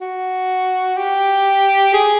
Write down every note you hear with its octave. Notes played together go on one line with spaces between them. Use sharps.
F#4
G4
G#4